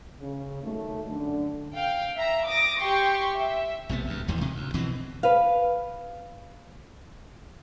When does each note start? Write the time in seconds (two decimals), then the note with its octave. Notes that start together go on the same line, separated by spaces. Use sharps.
0.19 C#3
0.62 D#3 F#3 A3
1.08 F#2 D3
1.74 F5 G5
2.16 E5 A#5
2.46 D6 D#6 A#6
2.80 G4 G5 C6 C#6
3.36 E5
3.89 A#1 C3 A3 B3
4.07 D2 G2
4.28 D#2 G#2 E3
4.41 C3
4.55 D2
4.74 B2 E3 G3 C4
5.23 B4 F5